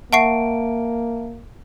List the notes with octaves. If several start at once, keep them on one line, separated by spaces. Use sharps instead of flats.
A#3 E5 F#5 A5 C#6 C7 D7